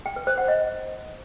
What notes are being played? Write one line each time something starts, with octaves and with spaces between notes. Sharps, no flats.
G5
B4
C5
F#5
D#5